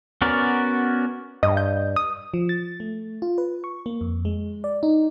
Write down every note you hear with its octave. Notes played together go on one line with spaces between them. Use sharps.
B3 C#4 F#4 A#4 D5
G2 D#5
G6
D#6
F3
A6
A3
F4
B4
C#6
A#3
F2
G#3
D5
D#4